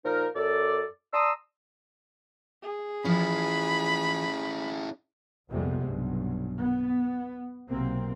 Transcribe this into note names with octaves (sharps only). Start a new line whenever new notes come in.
A#2 F3 D#4 A#4
F#2 A4 D5
D5 A5 A#5 C6 D#6 E6
G#4
E3 F3 C#4 E4 B5
A#1 F2 C3 G3 G#3 B3
B1 G2
B3
B1 C3 A#3 C4